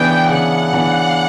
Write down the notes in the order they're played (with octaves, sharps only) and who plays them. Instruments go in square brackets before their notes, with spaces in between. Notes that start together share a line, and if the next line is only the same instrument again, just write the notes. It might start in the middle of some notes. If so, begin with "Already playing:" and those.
Already playing: [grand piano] C#3 E3 B3 D4 [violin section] G5
[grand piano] C#3 [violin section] F#5
[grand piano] E3 B3 D4